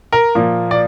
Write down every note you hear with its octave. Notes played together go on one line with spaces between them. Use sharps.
A#4
A#2 F3 A#3
D5